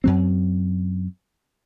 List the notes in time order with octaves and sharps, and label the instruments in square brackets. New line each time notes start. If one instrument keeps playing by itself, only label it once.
[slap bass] F#2 F#3 C4